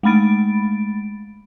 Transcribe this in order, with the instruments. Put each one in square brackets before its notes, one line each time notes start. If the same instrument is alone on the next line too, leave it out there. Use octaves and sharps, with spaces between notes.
[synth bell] G#3 A3 B5 A6 D7